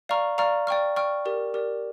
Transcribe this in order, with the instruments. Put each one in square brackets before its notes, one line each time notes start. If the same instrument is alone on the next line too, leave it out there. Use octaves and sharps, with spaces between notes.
[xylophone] D5 F5 A#5 C#6 F6
D5 F5 A#5 C#6 F6
D5 G5 C#6 F6
D5 G5 C#6 F6
G4 A#4 D5
G4 A#4 D5